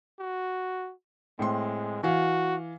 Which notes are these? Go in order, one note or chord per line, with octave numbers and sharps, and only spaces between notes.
F#4
A2 G#3 C4 C6
E3 F#4 F5